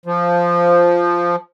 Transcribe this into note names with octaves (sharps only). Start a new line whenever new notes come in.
F3